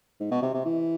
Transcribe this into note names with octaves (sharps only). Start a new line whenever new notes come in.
G#2
B2
C3
C3
E3